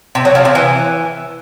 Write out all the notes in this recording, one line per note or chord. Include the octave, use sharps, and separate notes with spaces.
C3
F#3
F3
C3
E3